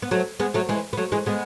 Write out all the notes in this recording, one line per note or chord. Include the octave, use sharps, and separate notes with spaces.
B3
F#3 A3
G#3 B3
F#3 A3
E3 G#3
B3
F#3 A3
E3 G#3
G#3 B3